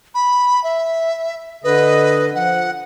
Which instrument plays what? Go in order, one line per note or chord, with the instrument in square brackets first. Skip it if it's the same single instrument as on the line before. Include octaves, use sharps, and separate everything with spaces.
[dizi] B5
E5
[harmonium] D3 D#5 [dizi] B4
[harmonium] F3 [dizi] F#5